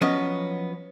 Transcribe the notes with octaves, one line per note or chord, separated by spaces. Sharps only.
F3 F#3 B3 C#4 D#5